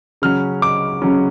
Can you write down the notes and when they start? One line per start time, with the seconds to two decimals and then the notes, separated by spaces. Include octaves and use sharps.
0.22 C#3 F#3 C#4 F6
0.62 D6
1.02 C#3 F#3 C#4